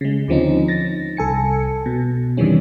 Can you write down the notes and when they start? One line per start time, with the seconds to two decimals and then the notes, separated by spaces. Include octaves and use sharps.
0.01 C#3 G#3
0.28 D#2 D3 F3 C4 C#4 D#4
0.68 A6 A#6
1.17 C2 A4 G#5 C#7
1.86 B2
2.37 F2 C3 D#3 E3 G3 C#4